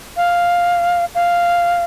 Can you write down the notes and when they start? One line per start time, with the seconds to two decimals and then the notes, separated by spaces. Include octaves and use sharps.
0.17 F5
1.15 F5